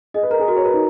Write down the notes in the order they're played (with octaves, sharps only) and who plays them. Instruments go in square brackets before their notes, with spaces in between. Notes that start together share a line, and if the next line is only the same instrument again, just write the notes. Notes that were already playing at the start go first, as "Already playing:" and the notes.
[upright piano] G#4 [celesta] D#5
[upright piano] B4
[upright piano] A#4 [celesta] A#5
[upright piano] G#4
[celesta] F#4 [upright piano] A#4
[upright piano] C#5
[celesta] A#4 [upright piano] B4
[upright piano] D#4